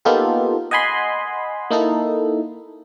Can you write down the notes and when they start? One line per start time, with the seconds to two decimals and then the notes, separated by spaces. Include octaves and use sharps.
0.05 A#3 B3 D#4 F4 G4 A4
0.71 D#5 F#5 G#5 B5 C6
1.71 A#3 D#4 E4 A4